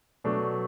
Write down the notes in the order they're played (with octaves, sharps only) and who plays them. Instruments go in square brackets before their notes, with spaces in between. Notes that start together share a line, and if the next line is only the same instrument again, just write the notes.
[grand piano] B2 F#3 A3 D4